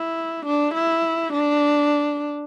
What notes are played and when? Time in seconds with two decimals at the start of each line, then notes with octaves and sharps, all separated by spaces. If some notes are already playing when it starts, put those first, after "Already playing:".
Already playing: E4
0.46 D4
0.74 E4
1.33 D4